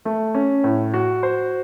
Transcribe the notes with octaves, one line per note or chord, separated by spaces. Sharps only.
A3
C#4
A2
F#4
C5